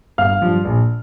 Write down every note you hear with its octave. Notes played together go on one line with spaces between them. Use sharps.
G1 F5 F6
G2 F3
A#1